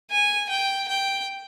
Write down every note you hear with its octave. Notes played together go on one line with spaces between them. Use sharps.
G#5
G5
G5